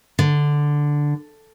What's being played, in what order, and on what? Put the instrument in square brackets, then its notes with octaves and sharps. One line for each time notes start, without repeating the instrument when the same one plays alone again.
[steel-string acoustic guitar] D3